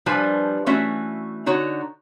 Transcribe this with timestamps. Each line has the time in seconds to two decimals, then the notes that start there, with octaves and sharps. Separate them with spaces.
0.06 F3 G3 D4 B4 G#5 A5
0.66 E3 A3 C#4 F#4 E5
1.46 D3 D#4 F#4 C#5